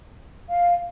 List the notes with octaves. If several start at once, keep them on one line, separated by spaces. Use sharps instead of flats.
F5